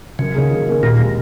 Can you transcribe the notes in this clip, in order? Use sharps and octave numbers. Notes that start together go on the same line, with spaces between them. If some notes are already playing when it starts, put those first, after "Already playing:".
F#2 C#3
D#3 A#3 C#4 G#4
F#2
D#3 A#3 C#4 G#4
D#2 A#2
C#3 G#3